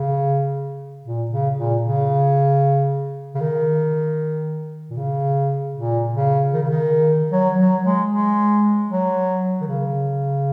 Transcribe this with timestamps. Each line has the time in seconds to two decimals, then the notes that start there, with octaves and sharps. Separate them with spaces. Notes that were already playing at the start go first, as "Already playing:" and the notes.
Already playing: C#3
1.05 A#2
1.31 C#3
1.58 A#2
1.83 C#3
3.35 C#3
3.40 D#3
4.90 A#2
4.97 C#3
5.75 A#2
6.14 C#3
6.54 D#3
6.62 C#3
6.70 D#3
7.32 F#3
7.58 F#3
7.84 G#3
8.11 G#3
8.89 F#3
9.61 D#3
9.67 C#3